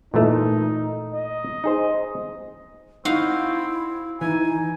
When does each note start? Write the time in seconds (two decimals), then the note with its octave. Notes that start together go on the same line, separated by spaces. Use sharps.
0.14 A#2 E3 A3 D#4
1.14 D#5
1.64 D#4 G#4 C5
3.05 C4 D#4 E4 F#4 F5
4.21 E3 D#4 G#5